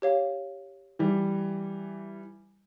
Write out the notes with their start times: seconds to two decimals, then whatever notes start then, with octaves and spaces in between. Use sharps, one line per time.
0.02 G4 C#5 F5
0.99 E3 G3